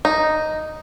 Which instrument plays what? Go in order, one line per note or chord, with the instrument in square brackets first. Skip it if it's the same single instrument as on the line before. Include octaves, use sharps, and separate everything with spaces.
[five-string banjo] D#4